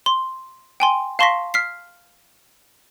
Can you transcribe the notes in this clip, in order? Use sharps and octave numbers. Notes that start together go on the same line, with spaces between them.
C6
G5 G#5 C6
F5 A5 C6 C#6 A#6 B6
F6 B6 C7